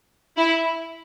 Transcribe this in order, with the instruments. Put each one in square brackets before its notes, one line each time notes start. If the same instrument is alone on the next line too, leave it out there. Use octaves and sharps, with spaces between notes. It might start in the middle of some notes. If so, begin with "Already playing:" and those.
[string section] E4